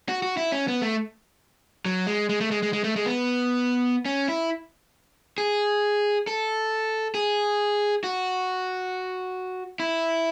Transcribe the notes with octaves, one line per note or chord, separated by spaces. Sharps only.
F#4
F#4
E4
C#4
B3
A3
F#3
G#3
G#3
A3
G#3
G#3
G#3
A3
G#3
B3
C#4
E4
G#4
A4
G#4
F#4
E4